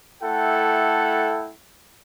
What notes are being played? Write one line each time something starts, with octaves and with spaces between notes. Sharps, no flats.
A3 E4 A4 F#5 G5